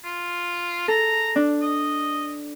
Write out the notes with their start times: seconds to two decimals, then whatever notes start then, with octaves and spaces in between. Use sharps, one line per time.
0.04 F4
0.88 A4 A#5
1.36 D4
1.62 D#5